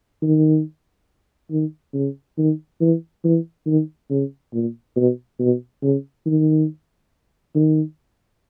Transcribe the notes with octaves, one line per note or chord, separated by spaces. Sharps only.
D#3
D#3
C#3
D#3
E3
E3
D#3
C#3
A#2
B2
B2
C#3
D#3
D#3